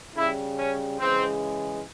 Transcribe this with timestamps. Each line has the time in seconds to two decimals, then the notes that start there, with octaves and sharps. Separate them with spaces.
0.16 C#3 G3 E4
0.58 C#4
0.99 C#3 E3 G#3 C4